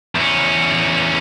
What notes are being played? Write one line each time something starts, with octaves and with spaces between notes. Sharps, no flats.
E2 C#4